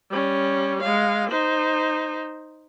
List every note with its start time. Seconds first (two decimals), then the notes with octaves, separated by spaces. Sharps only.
0.10 G3 C#4
0.83 G#3 F5
1.30 D#4 C5